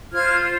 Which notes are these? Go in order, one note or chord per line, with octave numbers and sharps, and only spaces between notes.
F4 C5 F6 G#6